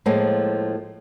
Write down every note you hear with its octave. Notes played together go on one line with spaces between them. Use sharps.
A2 F3 G#3 A#3